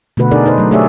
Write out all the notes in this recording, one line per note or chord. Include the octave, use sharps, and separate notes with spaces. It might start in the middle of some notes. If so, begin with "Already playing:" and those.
B2 D3 A3 F#4 B4
D4 D#4 G#4 A#4 D5
D#4 B4 C5
F#3 A3
A3 G4 G#4 C#5 D5 E5